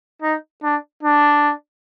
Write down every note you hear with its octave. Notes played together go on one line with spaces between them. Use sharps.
D#4
D4
D4